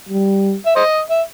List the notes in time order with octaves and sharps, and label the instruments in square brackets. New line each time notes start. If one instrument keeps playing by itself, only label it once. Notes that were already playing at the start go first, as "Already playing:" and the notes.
[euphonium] G3
[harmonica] E5
C5 D#5
E5